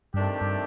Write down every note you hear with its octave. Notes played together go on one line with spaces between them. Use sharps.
G2 C3 D#3 A3 D4 G4
G2